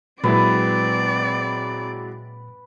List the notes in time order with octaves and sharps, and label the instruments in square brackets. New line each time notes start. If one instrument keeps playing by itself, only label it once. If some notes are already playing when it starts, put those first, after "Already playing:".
[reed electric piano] A#2 [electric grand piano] F#3 G#3 E4 [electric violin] C4 D5 [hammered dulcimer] B4